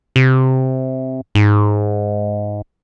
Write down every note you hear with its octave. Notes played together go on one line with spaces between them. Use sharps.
C3
G#2